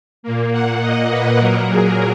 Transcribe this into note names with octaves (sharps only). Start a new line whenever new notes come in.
A#2 A#3
F#5
D#5
B4
A#2 F#3 A#3 A#4
G#4